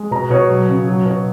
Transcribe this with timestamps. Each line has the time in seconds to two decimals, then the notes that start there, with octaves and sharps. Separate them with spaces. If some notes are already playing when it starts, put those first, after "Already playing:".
Already playing: G#3
0.11 B2 A#5
0.30 B2 C#5
0.49 F#3
0.69 C#3
0.88 F#3
1.06 B2